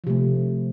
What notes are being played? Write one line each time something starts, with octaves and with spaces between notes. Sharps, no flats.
C3 F3 A3